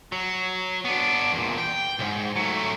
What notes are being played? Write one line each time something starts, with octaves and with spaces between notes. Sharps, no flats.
F#3
B3 D4
E2 A#2
G5
B1 G#2
F#3 A3